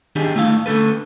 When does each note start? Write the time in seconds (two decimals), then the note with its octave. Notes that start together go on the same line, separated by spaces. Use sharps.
0.16 D#3 D4 D#4 G4 G#4
0.36 A3 E4 F5
0.66 D3 A3 A4 B4